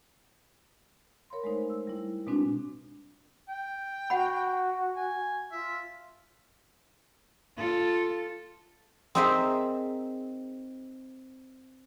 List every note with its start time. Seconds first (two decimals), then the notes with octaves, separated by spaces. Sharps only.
1.30 A#4 C#5 F5 B5 C6
1.44 G#3 A3 D#4 C5
1.70 E6
1.87 G3 E4
2.27 B2 G#3 C4 D4 D#4 F#4
3.49 G5
4.10 F#4 F#5 B5
4.96 G#5
5.52 F4 E5
7.57 F4 A4
9.15 C4 D#4 G#4 A#4 C5 E5